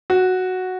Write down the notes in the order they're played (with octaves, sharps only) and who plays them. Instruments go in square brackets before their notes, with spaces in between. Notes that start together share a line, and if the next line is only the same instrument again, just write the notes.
[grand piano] F#4